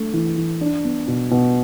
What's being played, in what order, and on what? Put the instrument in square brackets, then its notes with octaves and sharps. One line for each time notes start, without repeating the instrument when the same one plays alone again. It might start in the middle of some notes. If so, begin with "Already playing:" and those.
Already playing: [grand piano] A3 D4
E3
E3
D4
B3
B2
B2